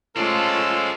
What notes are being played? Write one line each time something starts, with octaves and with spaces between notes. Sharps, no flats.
F3 G#3 A3 C#4 F4 A4 C5 D5